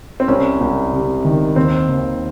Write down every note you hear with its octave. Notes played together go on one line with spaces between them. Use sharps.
C4
C2 C#4
C2
C3
D#3
D#2 C4
D#2